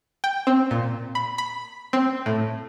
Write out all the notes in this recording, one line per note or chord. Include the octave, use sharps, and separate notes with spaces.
G5
C4
A#2
B5
B5
C4
A2